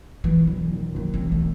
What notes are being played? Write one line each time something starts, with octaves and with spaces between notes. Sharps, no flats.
E1 E3
E1 F#3
D#3
D#2 F#3
C4
E1
A3